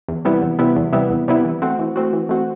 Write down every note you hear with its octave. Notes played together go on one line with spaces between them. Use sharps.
E2
C3 G3 B3 E4
E2
C3 G3 B3 E4
E2
C3 G3 B3 E4
E2
C3 G3 B3 E4
E3
A3 C4 F#4
E3
A3 C4 F#4
E3
A3 C4 F#4